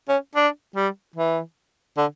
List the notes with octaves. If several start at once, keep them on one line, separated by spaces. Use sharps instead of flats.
C#4
D4
G3
E3
D3